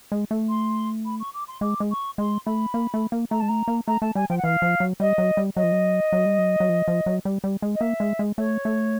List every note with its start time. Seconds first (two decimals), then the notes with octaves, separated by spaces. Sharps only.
0.12 G#3
0.31 A3
0.49 C6
1.05 B5
1.19 C#6
1.33 D6
1.48 C6
1.61 G#3 D6
1.80 G#3
1.90 C#6
2.18 G#3 C6
2.46 A3 B5
2.74 A#3
2.94 A3
3.12 A#3
3.30 A3 A#5
3.40 G#3 A5
3.48 A3 A#5
3.68 A#3
3.87 A3 A#5
4.01 A3 A5
4.15 G3 G#5
4.29 F3 G5
4.37 F#5
4.44 E3 F5
4.62 F3
4.80 F#3
5.00 G3 D#5
5.18 F#3
5.37 G3
5.56 F#3 D#5
5.63 F3
5.72 F#3
6.13 F#3
6.26 G3
6.38 F#3
6.60 F#3
6.69 F3
6.88 F3
7.06 F#3
7.25 G3
7.44 G3
7.62 G#3
7.75 D#5
7.81 A#3 E5
8.00 G#3
8.19 G#3
8.37 A3 C#5
8.65 A3